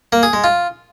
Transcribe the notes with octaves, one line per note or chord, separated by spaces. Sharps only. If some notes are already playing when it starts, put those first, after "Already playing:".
A#3
G#4
G#3
F4